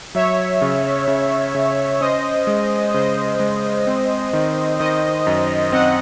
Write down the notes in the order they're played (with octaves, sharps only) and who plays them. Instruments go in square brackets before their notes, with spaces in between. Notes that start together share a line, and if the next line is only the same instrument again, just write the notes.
[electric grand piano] F#3 [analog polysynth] C#5 E5
[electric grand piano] C#3
C#3
C#3
[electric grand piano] C#4 [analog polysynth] C5 D#5
[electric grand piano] G#3
[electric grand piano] C#3 [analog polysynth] C5 D#5
[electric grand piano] G#3
C4
D#3
[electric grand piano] D#3 [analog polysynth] C5 D#5
[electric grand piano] F#2
[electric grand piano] C4 [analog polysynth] D#5 F#5